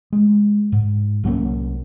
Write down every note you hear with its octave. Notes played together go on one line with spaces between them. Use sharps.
G#3
G#2
C2 F#3 A#3 C#4